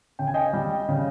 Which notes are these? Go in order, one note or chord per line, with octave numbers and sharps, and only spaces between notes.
C#3 G5
G#5
D#5 G5
G3
C#3